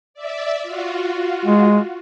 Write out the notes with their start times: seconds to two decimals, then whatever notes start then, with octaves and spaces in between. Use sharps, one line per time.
0.14 D5 E5
0.63 F4 F#4
1.45 G#3